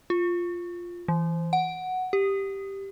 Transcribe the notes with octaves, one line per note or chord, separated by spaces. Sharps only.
F4
E3
F#5
G4